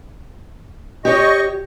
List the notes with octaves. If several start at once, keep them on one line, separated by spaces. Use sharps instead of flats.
G4 C#5 D#5 C#6